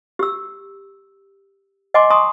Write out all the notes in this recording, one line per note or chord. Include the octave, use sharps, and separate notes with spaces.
G4 E6
D#5 F#5 G#5 C6 D6
G#5 A#5 C6 C#6 D#6